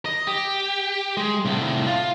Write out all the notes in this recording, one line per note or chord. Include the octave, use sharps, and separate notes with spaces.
D#5
G4
G#3
C2 A2
F4